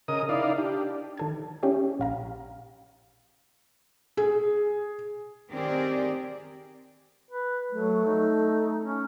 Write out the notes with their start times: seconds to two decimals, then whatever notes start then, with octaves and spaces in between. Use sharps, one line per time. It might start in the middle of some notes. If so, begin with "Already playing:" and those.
0.08 C#3 A#4 D#5 D#6
0.29 D#4 E4 D5 F5
0.58 D4 G4
1.17 D#3 A4 G#6
1.63 C#4 E4 G4 C#5
1.99 A#1 F5 A#5
4.17 G#4
5.51 D#3 C4 G4 G#4 A#4 D5
7.31 B4
7.72 F#3 A3
8.06 D#4
8.81 C#4